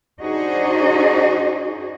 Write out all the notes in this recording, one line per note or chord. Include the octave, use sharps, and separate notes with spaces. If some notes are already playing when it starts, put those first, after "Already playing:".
D4 D#4 F#4 G#4 C5 D#5